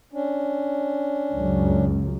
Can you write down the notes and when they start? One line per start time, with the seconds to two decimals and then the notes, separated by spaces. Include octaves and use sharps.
0.13 C#4 D4
1.34 C#2 F#2